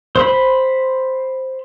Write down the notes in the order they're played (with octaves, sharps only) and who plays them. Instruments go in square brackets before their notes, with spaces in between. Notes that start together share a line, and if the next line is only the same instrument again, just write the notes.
[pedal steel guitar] C5 B5